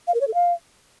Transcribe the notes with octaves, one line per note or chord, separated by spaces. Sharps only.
F5
A#4
C#5
A4
F5